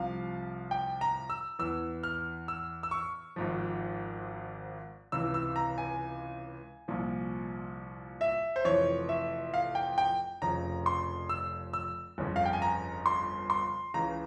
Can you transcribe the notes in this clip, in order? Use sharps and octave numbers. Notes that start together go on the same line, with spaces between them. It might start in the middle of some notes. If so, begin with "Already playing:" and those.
Already playing: C2 C3 F3 F5
G5
A#5
E6
E2 E3 E6
F6
E6
E6
C#6
G#1 G#2 F3
C#2 C3 E3 E6
E6
A#5
G#5
C2 A#2 F3
E5
C5
F1 F2 E3 C#5
E5
F5
G5
G5
F1 F2 C#3 F3 A#5
C6
E6
E6
G1 F2 C#3
F5
G5
G#5
A#5
C6
C6
C#2 C#3 E3 A#5